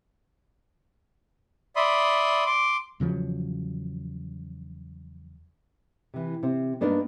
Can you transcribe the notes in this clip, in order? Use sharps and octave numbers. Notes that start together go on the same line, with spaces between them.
D5 E5 B5 C6 D#6
C6 D6
E2 C#3 F3 F#3
C3 E3
C3 C4
G2 A#3 B3 D4 D#4 A#4